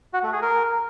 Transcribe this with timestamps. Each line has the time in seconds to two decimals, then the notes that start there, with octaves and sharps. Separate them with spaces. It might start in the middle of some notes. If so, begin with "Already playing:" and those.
0.13 F#4
0.23 A3
0.32 G#4
0.42 A#4